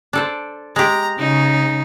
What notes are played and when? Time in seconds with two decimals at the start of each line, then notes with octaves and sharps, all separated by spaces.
0.13 D4 A4 C5
0.76 G#3 G4 A#5
1.19 C#3 D#4